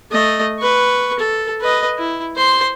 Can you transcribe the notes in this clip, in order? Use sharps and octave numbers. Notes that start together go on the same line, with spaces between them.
A3 D#5
B4 C#6
A4
B4 D#5
E4
C5 C6